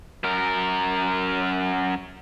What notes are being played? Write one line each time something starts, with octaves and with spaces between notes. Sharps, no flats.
F#2 A#4